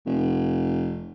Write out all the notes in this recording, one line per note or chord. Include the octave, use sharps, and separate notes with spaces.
F1